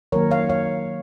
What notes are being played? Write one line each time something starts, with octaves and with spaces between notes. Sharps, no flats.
D#3 F#3 A#3 A#4 C#5
C#5 F5
C#5 F5